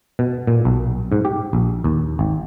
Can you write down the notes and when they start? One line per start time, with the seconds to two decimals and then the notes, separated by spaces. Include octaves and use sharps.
0.19 B2
0.47 A#2
0.65 B1
1.12 G#2
1.25 G4
1.53 A#1
1.84 D#2
2.19 G#1